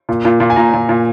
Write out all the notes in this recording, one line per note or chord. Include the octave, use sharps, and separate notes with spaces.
A#2
A#2
A#2
G#5
A#2 A#5
A#2
A#2